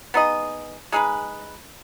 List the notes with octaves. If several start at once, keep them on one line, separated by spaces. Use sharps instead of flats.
B3 D#4 G#4 D#5
G#3 D#4 G#4 B4